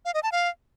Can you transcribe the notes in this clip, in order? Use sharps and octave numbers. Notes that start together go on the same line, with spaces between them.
F5
D#5
A5
F5